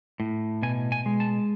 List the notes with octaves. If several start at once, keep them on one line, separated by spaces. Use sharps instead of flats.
A2
B2 G#5
G#5
G#3
A5